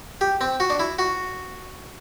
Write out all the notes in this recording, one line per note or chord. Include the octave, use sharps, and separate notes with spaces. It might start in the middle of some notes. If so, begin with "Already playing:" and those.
G4
C4
F#4
D4
E4
F#4